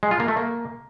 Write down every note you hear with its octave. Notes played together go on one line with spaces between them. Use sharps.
G#3
F4
A#3
A3
A#3